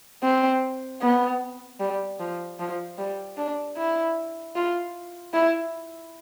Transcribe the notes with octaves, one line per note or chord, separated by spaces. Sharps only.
C4
B3
G3
F3
F3
G3
D4
E4
F4
E4